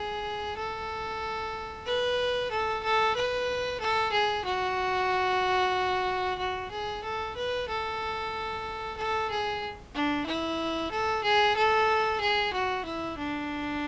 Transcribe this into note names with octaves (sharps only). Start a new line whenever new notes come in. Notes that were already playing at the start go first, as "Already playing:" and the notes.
Already playing: G#4
A4
B4
A4
A4
B4
A4
G#4
F#4
F#4
G#4
A4
B4
A4
A4
G#4
D4
E4
A4
G#4
A4
G#4
F#4
E4
D4